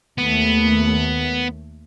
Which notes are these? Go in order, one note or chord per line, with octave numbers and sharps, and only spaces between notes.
D#2 A3 B3